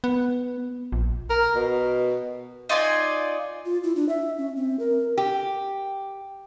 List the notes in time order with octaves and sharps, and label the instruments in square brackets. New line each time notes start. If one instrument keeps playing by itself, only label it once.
[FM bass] B3
A#1
[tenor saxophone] A#4
B2
[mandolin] D#4 F4 D5 G#5
[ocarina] F4
E4
D4
E5
C#4
C4
A#4
[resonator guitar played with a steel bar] G4